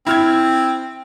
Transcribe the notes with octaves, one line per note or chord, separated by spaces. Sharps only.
C4 E4 F6 G#6